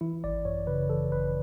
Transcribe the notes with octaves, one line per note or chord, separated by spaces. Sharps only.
E3 E4
G#1 D5
F#2 C#5
C#3 B4
E3 A4
G#1 B4